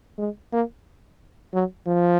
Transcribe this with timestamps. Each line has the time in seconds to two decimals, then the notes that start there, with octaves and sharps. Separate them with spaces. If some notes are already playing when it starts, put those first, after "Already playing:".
0.18 G#3
0.53 A#3
1.54 F#3
1.87 F3